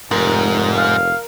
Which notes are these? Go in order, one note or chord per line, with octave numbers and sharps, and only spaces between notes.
F1 G#2 A#4
F5